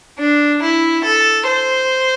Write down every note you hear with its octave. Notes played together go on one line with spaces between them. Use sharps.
D4
E4
A4
C5